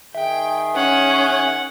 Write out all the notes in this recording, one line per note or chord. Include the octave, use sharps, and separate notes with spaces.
D#3 G#4 E5 G5
C#4 F#5